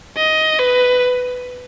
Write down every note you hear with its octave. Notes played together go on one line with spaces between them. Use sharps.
D#5
B4